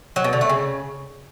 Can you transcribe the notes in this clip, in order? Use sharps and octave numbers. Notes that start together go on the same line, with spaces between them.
F#3
B2
D3
A3
C#3